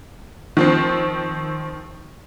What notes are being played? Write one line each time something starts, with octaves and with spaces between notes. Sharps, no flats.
D#3 F3 C4